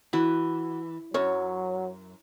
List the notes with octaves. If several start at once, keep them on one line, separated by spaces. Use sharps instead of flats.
E3 E4 F#4
F#2 F#3 C#5